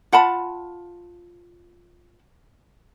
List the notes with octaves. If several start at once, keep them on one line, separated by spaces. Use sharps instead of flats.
F4 F#5 A5 B5